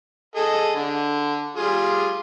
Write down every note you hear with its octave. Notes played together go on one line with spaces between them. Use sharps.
G#4 A4 D#5
D3
G3 F4 G#4